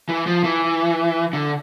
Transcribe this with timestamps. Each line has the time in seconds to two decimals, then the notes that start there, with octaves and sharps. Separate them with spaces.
0.09 E3
0.26 F3
0.44 E3
1.33 D3